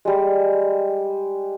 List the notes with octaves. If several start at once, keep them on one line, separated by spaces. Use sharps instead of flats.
G3 G#3